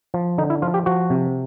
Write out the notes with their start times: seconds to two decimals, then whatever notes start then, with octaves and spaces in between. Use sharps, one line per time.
0.14 F3
0.38 D3 D#4
0.50 E4
0.62 F3 F4
0.74 G4
0.86 F3 F#4
1.10 C3